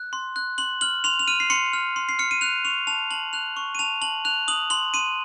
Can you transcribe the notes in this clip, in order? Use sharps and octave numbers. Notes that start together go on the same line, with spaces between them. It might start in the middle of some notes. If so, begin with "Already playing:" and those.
Already playing: F#6
C6
F#6
C6 F#7
F6 F#7
C6 F7
F7
F6 D#7
C7
C6 C#7
F6
C6
C7
F6 C#7
D#7
F#6 F7
C#6 F7
A5 F7
A5 F#7
F#6 F7
C#6
D#7
A5 F7
A5 F#7
F#6 F7
D#6 F#7
C6 F#7
C6 D#7